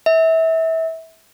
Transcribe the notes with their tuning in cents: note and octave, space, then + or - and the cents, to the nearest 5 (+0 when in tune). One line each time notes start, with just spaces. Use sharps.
E5 -25